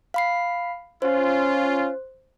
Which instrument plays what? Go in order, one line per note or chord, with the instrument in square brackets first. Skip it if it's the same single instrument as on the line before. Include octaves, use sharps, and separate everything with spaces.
[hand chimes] F5 B5 C7
[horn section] C#4 F4 [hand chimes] C5